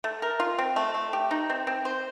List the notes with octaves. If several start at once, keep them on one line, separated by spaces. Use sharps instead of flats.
A3
A#4
F4
C4
A3
A3
G4
D#4
C4
C4
C5